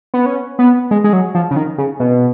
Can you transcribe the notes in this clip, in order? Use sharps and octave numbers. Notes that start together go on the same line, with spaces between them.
B3
C#4
B3
G#3
G#3
F#3
F3
C#3
D#3
C#3
B2